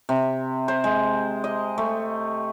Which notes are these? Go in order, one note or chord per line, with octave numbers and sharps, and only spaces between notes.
C3
C5
G#3
D#5
A3